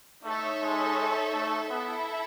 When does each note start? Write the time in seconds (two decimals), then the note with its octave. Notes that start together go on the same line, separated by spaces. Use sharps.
0.24 A3 D#4 A4 C#5 E5
0.61 G#3
1.33 A3
1.70 B3 E4 A4 E5